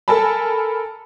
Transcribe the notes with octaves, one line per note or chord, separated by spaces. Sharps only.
A4 A#4 G#5 A5 B5